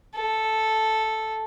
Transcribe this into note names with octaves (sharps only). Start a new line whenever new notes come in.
A4